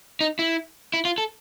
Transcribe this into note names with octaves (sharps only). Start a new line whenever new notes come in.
D#4
E4
E4
F4
A4